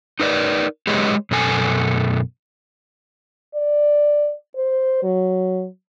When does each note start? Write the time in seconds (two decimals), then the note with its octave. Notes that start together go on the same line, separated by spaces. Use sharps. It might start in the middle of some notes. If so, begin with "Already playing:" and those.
0.20 D#4 A#4 B4 D5
0.87 G#3 G4 G#4 B4 C#5 D#5
1.31 F#2 B2 A4 G#5
3.54 D5
4.56 C5
5.03 F#3